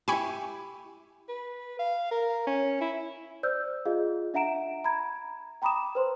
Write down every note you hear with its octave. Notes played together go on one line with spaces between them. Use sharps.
E4 G4 G#5 B5 C#6
B4
F5
A#4
C#4
E4
C5 D5 E6 F6 G6
F4 G#4 D#5 F5
D4 E5 F#5 A#5 D7 E7
A#5 B5 G#6
G5 A#5 B5 D6 D#6 E7
B4 C5 C6